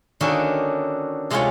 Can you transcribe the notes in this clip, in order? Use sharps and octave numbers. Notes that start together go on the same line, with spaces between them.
D3 D#3 A#3 C#4 D4 F#4
C3 G#3 A3 F4 G4 C#5